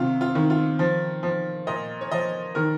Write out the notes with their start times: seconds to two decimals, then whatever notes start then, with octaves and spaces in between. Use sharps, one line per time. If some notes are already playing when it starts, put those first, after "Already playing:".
Already playing: C3 D#3 F4
0.21 F4
0.35 D#3
0.50 F4
0.79 F3
1.23 F3
1.67 A#2 D#5
2.01 C#5
2.12 F3 D#5
2.55 D#3 A#4